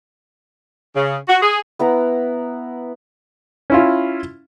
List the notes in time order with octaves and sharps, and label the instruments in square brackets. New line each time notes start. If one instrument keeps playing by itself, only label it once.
[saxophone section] C#3
F#4
G#4
[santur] B3 E4 F#5 A#5
[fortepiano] C#4 E4 F4